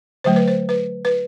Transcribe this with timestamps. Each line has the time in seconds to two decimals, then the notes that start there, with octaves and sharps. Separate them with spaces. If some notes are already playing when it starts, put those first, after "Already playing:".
0.24 D3 F#3 A3 C5
0.36 B4
0.48 C5
0.69 B4
1.05 B4